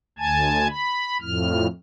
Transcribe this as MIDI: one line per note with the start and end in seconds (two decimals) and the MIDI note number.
0.19 0.68 38
0.19 0.68 80
0.19 0.68 81
0.19 0.68 92
0.69 1.17 83
1.21 1.67 41
1.21 1.67 45
1.21 1.67 89